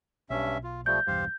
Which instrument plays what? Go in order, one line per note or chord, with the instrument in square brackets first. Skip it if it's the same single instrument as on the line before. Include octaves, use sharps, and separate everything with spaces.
[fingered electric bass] B1 [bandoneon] G2 C#4 E5
[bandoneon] F4
[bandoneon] F3 G3 A3 [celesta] G6
[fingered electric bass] B1 E2 G2 [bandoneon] G4 C5 F5